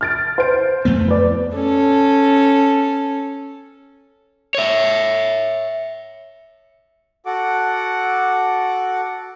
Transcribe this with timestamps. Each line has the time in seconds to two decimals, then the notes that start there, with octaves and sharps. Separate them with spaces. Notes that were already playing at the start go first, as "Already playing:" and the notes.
0.01 F6 A6 D7
0.38 C5 D7
0.85 F2 A3 B3
1.08 B4 D5
1.55 C#4 A4
4.55 C#5 E5
7.26 F#4 A4 F#5 D6